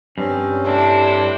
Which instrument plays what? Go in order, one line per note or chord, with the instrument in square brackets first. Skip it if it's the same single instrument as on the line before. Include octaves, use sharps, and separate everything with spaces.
[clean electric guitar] G2 [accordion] C4 C#4
[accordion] A2 C3 [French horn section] E3 C4 E4 [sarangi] D4